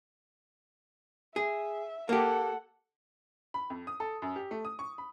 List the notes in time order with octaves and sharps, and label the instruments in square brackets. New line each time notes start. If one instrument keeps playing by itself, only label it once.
[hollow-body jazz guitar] G#4 [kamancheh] E5
[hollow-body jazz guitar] A#3 G4 [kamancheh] A4 F#5
[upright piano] B5
F2
D#6
A4
F#2
G4
A3
D#6
C#6
B5